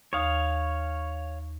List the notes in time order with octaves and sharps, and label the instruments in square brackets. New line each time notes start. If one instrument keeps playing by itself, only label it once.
[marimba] D#2 D#6 [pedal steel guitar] C#5 F5